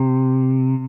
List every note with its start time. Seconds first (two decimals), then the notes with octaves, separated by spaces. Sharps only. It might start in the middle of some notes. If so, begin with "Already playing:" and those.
Already playing: C3